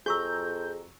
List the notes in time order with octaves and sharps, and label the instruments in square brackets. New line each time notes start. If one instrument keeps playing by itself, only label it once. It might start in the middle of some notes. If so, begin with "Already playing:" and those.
[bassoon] F2 [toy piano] F#4 C#6 E6 [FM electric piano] G#4 A#5 [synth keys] G6